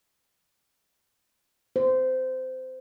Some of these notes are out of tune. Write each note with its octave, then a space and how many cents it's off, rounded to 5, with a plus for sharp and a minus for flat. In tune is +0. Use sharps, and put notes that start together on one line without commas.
C5 -20